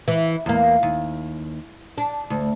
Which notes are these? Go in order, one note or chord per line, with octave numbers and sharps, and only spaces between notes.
E3
E2 A#3
D#2
D4
D2